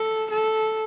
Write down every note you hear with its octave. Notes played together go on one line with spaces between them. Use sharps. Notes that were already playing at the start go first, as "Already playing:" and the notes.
Already playing: A4
A4